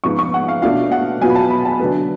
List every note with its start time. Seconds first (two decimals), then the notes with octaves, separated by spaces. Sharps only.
0.04 G#2 F3 B3 F4 C#6
0.19 C#6
0.34 F#5
0.48 F5
0.62 B2 A3 D4 F4 F5
0.91 F#5
1.21 B2 F#3 B3 F4 G#5
1.30 B5
1.35 A5
1.50 B5
1.65 A5
1.79 D3 F#3 A3 B4